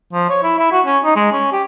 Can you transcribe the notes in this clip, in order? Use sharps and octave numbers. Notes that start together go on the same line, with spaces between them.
F3
C#5
E4
E4
F#4
C#4
D#4
G#3
C#4
G4